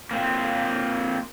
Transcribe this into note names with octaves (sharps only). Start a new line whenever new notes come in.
A#3 C4 F4